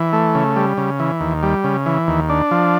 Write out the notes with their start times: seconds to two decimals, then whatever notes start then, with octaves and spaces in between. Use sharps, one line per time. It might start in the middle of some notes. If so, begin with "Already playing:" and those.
Already playing: E3
0.13 A3
0.35 C#3
0.56 G3
0.77 C#3
0.99 E3
1.21 D#2
1.43 G3
1.64 C#3
1.86 E3
2.08 D#2
2.29 D4
2.51 F3